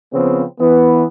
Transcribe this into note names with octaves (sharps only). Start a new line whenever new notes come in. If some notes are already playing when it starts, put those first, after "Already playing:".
C#3 F3 B3 C4
E3 B3